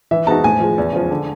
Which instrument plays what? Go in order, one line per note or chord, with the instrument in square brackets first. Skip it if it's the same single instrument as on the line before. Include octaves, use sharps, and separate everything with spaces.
[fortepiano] E3 [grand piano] E5
[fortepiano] G#3 B3 D#4 F#4 [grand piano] A5
[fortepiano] A2 [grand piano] G#5
[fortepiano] F3 G#3
E2
C#3 F3 G#3
D3